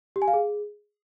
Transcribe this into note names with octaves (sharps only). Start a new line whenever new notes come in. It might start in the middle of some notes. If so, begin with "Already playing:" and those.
G4
G#5
F5
G#4